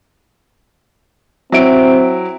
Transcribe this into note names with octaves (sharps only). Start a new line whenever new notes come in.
F#3 C4 E4 D7